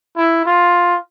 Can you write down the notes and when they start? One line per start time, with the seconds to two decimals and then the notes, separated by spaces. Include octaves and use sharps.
0.17 E4
0.45 F4